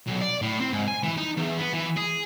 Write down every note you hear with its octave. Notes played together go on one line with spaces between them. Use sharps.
B1
D5
A2
C4
G#2
G#5
E3
D#4
E2
B3
E3
G#4